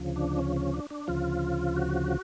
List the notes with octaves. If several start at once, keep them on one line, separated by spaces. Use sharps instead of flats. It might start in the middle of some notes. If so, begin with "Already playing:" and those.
Already playing: D2 C#3 F3
D4
C#4
C#4
D4
D4
D2 C#3 F3 F4
F#4